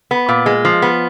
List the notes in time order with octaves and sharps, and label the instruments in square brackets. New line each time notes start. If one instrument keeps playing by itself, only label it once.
[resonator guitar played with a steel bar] B3
A#2
G#3
F3
B3